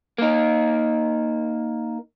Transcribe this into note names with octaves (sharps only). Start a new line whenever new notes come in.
A#3 D#4